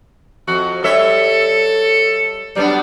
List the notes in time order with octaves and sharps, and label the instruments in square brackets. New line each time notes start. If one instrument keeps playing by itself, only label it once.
[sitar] F2 [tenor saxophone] F#4
[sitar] G3 C#5 E5 [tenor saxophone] A4
[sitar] F#3 B3 D4 [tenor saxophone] G3